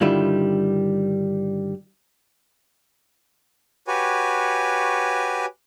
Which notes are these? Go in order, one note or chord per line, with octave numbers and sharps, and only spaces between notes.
G2 D3 D#3 G3 E4 F4
F#4 G4 B4 C#5 G#5